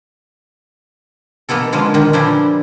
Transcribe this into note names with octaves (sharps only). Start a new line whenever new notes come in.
B2 E3 A#3 B3 E4 A4
D3 F3 G#3 A#3 C#4
A#2 D3 D#3 A#3
E3 F3 G3 A3 D4 E4